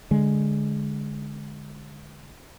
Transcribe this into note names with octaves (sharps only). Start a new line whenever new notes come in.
D3 G#3